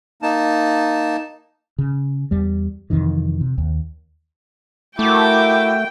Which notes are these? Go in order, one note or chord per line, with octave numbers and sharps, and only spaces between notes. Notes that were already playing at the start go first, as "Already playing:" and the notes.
A#3 D#4 A5
C#3
E2 G3
F2 C3 D#3 E3
C3
D#2
A3 E4 F#4 A#4 G5 D6